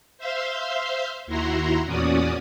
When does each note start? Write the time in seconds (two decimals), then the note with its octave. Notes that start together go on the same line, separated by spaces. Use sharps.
0.18 C5 E5 F5 C6
1.27 D#2 E4 F#4 A#5 C6
1.85 E2 A#2 C#4 F#4 D5 D#6